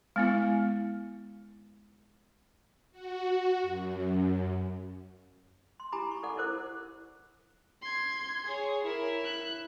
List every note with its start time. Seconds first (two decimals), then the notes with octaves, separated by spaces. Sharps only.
0.16 G#3 B3 E4
2.91 F#4
3.62 F#2
5.80 C6
5.92 E4 G4 G#5 A#5 B5 D6
6.11 C#6
6.23 A4 D5 F#5
6.37 E4 A#4 C5 D6
7.81 C6 G#6
8.44 G#4 C#5
8.84 E4 A#4
9.24 F#6